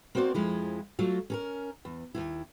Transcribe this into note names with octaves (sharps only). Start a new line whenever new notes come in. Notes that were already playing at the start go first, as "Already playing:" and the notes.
A#3 C4 F#4 C5 D5
F2 F3 G#3 E4
F#3 A3 F4
C#4 A4 A#4
E2
D#2 G#2 E4